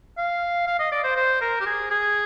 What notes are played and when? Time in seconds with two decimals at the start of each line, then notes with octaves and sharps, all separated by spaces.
0.17 F5
0.67 F5
0.79 D#5
0.92 D5
1.04 C5
1.16 C5
1.41 A#4
1.60 G4
1.66 G#4
1.90 G#4